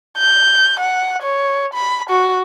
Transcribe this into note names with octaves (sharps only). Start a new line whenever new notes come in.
G6
F#5
C#5
B5
F#4